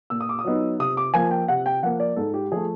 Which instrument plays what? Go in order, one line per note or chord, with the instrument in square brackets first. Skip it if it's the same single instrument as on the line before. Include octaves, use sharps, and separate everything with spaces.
[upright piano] A#2 E6
D#6
D6
D#6
F#3 B3 D#4
C3 D#6
D6
F3 A#3 G#5
G5
C3 F#5
G5
F3 A#3 F#5
D5
G#2 A4
G4
F3 A3 G#4